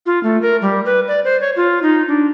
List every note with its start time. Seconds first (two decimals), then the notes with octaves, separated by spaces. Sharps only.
0.06 F4
0.23 A3
0.42 A#4
0.62 G3
0.86 B4
1.08 D5
1.24 C5
1.41 C#5
1.56 F4
1.82 D#4
2.08 D4